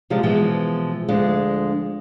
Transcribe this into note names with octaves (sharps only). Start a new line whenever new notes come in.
C3 F3 G3 G#3
B2 E3 F3 G#3
D2 F3 G#3 D4